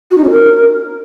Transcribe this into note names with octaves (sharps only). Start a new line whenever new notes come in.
F#4
D#4
C#4
A#4